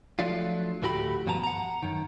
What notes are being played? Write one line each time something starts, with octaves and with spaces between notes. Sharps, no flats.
F3 F#3 A3 D4 F4
D2 A2 A3 F#4 G4 B5
G2 B2 F3 B3 A5 A#5
F#5 A#5
F#2 D#3